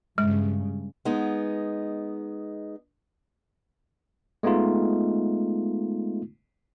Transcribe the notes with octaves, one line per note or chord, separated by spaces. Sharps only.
G2 C#3 G#3
G#3 B3 D#4
G#3 A3 B3 D#4 F4